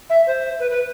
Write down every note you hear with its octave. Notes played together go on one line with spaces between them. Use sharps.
E5
C5
B4
B4